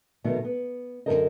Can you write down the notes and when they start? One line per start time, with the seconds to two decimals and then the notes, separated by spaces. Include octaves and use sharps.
0.24 D2 B2 D#3 F#3 B3
0.45 B3
1.06 F#2 A#2 D3 A#4 C5 D#5